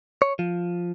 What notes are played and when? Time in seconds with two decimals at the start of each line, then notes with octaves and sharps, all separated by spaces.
0.22 C#5
0.39 F3